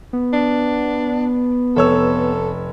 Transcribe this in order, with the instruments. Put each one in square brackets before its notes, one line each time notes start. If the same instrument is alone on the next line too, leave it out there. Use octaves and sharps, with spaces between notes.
[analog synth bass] B3
[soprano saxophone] D4
[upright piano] F1 C#5 E6 [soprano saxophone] A4